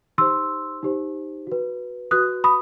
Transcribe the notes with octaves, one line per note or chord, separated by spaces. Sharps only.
D#4 G4 C5 C6 E6
D#4 G4 C5
F#4 B4
F#4 B4 D#6 F#6
B5 D#6